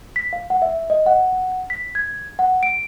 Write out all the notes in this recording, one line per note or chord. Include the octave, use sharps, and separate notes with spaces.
B6
F5
F#5
E5
D#5
F#5
B6
G#6
F#5
D7